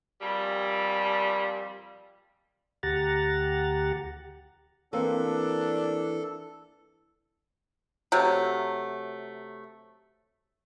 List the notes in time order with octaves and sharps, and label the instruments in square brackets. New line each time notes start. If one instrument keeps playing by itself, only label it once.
[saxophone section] F2 A#2 G3
[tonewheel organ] D2 G4 F#5 A#5 A6
[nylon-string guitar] E3 A#3 C4 [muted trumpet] D4 [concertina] A4
[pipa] C3 F#3 A3